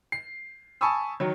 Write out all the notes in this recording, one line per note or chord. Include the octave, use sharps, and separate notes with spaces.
C7
G#5 A5 B5 C#6 D#6 E6
D#3 F#3